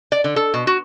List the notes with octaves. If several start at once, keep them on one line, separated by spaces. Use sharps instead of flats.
D5
D3
A4
B2
F#4